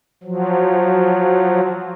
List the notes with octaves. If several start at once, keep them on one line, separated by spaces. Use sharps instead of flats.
F3 F#3